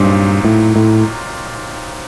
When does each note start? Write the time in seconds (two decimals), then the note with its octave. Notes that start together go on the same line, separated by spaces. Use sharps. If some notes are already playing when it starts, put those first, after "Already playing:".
Already playing: G2 A#2 F#3 C4 D#4
0.45 A2
0.76 A2